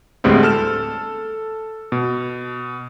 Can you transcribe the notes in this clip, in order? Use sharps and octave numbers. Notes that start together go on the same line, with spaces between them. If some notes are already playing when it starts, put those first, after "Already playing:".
D2 A2 G3 G#3 B3 C4
A4 F6 E7
B2